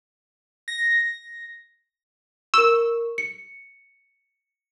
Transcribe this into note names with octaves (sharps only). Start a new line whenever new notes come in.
A#6
A#4 C#6 E6
C#7